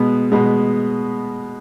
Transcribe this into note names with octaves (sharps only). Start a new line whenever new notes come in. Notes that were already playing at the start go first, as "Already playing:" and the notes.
Already playing: B2 G#3 B3
B2 G#3 B3